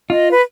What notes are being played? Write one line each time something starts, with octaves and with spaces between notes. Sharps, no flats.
F4 D#5
B4